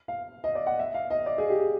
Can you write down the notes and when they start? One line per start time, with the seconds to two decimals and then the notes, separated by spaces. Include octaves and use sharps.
0.08 F5
0.44 D#5
0.55 D5
0.67 F#5
0.79 E5
0.94 F5
1.10 D#5
1.26 D5
1.38 G#4
1.50 G4